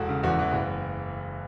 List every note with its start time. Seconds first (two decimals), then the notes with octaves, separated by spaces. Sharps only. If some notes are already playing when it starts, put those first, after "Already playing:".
Already playing: E1 F#4 A4
0.09 C#3
0.23 E2 F#4
0.39 E3
0.53 F#1